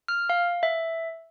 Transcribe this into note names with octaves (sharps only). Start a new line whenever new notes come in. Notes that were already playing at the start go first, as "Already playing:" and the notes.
F6
F5
E5